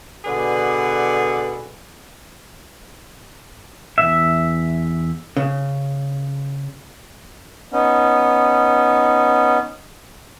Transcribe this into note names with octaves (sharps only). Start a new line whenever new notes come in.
B2 D3 G#4 B4 D5
E2 G2 E5
C#3
B3 C#4 D#4